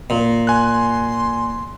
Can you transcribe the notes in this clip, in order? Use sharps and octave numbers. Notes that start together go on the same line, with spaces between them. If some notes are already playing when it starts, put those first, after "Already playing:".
A#2
G#5 C6 F#6